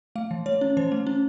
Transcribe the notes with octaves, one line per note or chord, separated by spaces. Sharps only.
A3 F5
E3
A3 C#5
C#4
E3 C5
A3
C#4